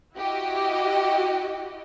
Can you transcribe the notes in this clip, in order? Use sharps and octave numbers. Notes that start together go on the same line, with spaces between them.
E4 F#4 G4 D#5